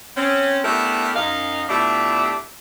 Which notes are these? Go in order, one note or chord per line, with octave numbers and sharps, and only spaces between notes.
C4 C#4
A3 B3 D4 E4 G4 A#4
F#2 D#4 F5
B2 A3 D4 E4 F4 G4